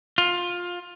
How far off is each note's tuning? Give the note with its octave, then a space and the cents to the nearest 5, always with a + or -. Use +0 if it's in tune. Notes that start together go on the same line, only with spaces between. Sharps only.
F4 +15